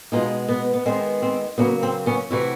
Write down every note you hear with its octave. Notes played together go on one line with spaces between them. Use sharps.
B2 G#3 B3 D#4 F4
B3
B3
D#3 G#3 B3 C4
C4
C#3 F#3 A#3 B3
C4
B3 C#4
C3 E3 A3 E4 F#4